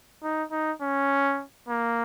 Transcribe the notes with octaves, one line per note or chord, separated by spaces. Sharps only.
D#4
D#4
C#4
A#3